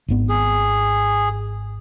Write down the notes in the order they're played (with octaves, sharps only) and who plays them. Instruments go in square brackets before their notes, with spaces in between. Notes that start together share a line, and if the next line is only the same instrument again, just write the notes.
[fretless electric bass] G#1 G#2 B3
[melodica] G#4